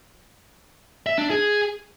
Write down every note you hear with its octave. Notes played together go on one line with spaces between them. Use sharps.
E5
D4
G#4